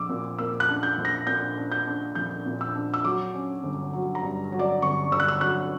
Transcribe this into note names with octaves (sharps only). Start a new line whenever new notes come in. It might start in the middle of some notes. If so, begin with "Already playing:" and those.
Already playing: A#1 D6 E6
A#2
A#3 E6
F#6
D4
G6
A#1
A#6
A#2 G6
D4
G6
D4
A#1 G6
A#2
E6
D4
E6
F#3 D6
C#4
G1
F#3
A#5
G2
F#3
D5
G1 C#6
G1 E6
F#6
E6
F#3 F#6